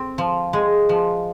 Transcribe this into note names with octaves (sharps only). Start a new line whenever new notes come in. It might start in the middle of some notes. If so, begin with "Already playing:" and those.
Already playing: C4
F3
G#3
F3